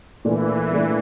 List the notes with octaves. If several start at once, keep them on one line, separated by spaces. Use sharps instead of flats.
A#2 E3 A3 D4
A#2 A3 D4